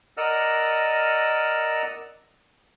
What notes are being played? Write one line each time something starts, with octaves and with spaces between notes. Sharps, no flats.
A#4 D5 D#5 F#5 E6 F6